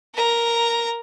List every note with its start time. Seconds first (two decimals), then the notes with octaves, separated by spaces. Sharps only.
0.15 A#4 A#5